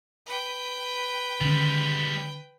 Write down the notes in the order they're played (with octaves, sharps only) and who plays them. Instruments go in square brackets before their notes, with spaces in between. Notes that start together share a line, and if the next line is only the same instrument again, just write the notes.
[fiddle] B4 G5
[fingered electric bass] D3 D#3 C#4 [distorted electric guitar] G3 G#3